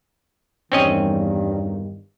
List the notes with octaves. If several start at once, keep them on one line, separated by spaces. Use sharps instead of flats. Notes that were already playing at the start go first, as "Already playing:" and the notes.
E2 G2 D#3 C4 C#4 D#5